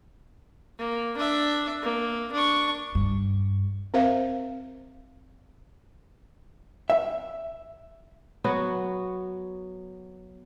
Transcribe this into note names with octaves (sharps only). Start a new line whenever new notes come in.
A#3
D4 E5
A#3
D4 C#6
G2
C4 A#4 C5 E5 F5
E5
F#3 B3 F#4